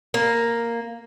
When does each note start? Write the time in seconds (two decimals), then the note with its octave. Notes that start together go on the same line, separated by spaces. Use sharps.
0.14 A#3